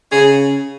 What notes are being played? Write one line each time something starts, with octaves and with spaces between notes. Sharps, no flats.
C#3 G#4 C#5